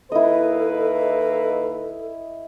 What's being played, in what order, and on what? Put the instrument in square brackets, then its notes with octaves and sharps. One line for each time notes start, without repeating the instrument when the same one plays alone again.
[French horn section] D#2 A#3 B4 [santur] E4 D#5 [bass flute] A4